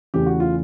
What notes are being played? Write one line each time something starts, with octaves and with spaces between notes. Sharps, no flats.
E2 C#3 E3 A3 G4
F#4
F4